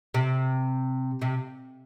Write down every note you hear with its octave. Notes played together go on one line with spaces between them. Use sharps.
C3
C3